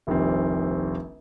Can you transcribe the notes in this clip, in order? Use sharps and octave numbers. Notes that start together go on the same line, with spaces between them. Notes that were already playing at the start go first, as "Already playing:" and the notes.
F1 A#1 D#3 G3 C4